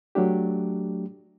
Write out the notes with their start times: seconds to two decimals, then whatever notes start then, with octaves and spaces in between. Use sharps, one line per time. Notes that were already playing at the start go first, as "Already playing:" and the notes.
0.15 F#3 A3 D4 G4